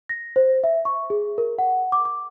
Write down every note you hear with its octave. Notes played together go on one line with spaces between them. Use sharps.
A#6
C5
E5
C#6
G#4
A#4
F#5
D6
D6